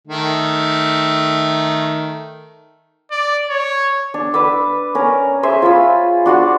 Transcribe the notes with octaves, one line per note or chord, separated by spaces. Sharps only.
D#3 A3
D5
C#5
D4
B4 D6 E6
C#4 A#4
G#4 C5 E5
F4 C#5 B5 E6
D4 F#4 D5 C6